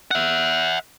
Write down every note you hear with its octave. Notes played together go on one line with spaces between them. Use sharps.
E5 F#5